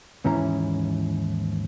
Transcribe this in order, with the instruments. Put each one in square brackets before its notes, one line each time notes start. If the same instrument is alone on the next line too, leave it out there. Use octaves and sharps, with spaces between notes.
[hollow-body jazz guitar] D#2 G#2 E3 C#4 E4 A#5